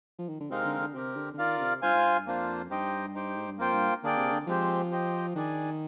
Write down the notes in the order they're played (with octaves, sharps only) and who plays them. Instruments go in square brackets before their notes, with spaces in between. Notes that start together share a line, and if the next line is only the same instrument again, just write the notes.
[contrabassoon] F3
D#3
D3
[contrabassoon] C3 [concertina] G#3 C4 D#4 A#4 F5
[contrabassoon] D3
D3
[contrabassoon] C3 [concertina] C4 G4 A#4
[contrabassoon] D3
D3
[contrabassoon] D#3 [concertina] F4 A#4 D5 F5
[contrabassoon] D3
C3
[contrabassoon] G2 [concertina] F4 C5 F5 G#5
[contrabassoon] G#2
G2
[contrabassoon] F2 [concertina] A#3 D4 F4 C5
[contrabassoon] G2 [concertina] D#4 G4 C5 D#5 G5
[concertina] D#4 G4 C5 G5
[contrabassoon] G#2
G2
[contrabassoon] F2 [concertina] A#3 F4 C5 G5
[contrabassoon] G2
[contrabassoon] D3 [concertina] A#3 D4 G#4 D5 G5
[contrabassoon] C3
D3
[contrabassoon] F3 [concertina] G#3 C4 G4 C5
[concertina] G4 C5 D#5 G5
[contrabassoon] D#3 [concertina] D4 G#4 D5 G#5